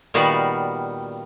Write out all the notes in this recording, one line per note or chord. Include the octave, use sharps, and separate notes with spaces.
A#2 D#3 G3 B3 F#4 F5